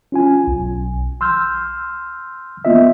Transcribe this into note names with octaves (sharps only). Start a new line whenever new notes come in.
C#4 F4 G#5
B1
C6 E6 F6 G6
A#3 B3 F4 D#5 E5